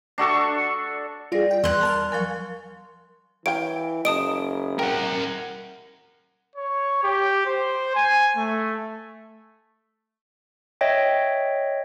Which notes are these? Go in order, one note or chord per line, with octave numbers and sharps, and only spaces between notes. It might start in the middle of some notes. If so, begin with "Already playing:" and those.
D4 F#4 A4 C#6
G3 F4 G#4 D5 A#6
G5
E2 C6 F#6
A#4 A5 F6
F3 F#3 A#4 G#5 C#6
E3 C#5 F5 G5 D7
F#1 D#5 A5 D#6 D7
A#4 F#5 G5
C#5
G4
C5
G#5
A3
C#5 D#5 E5 G5